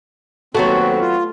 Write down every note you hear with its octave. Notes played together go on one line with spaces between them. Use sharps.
D#2 F#3 A3 B3 C4 F#4
F4